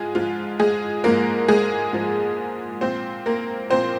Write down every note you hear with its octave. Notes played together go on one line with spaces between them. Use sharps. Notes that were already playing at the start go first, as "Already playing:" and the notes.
Already playing: G#2 F3 G#3 F4 G#4
G#2 F3 F4
G#3 G#4
G#2 F3 A#3 A#4
G#3 G#4
G#2 F3
A#2 F3 C4 C5
A#3 A#4
A#2 F3 C4 C5